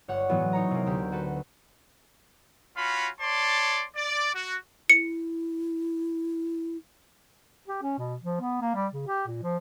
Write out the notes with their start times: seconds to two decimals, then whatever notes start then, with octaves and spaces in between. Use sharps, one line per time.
0.08 G1 C#5 F#5
0.29 A2 E3 F#3 G#3 B3
0.53 D#4 C#5 A#5
0.71 C3 G#3 A#3
0.86 D2 G4
1.12 F#4 A4 B4
2.77 C#4 F4 F#4 B5
3.21 C#5 D5 A5 C6
3.96 D5
4.35 F#4
4.90 E4 C#7
7.68 G4
7.83 C#4
7.98 B2
8.22 F3
8.41 B3
8.61 A#3
8.75 G3
8.93 C#3
9.07 G4
9.27 A#2
9.43 F3